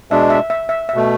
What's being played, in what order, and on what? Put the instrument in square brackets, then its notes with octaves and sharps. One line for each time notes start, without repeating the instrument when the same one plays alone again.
[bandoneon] B2 G#3 D4 [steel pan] E5
[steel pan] E5
E5
E5
E5
[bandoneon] B2 A3